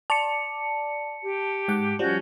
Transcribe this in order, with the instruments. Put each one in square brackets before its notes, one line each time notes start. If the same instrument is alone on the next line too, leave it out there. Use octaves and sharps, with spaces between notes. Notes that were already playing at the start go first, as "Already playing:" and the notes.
[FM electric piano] D5 [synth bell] A5 C#7
[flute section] G4
[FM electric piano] G#2 F#5 D6
[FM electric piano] F3 G3 [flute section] C#4 F#4 G6